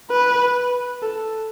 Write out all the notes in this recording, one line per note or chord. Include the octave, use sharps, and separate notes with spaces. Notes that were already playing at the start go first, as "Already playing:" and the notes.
B4
A4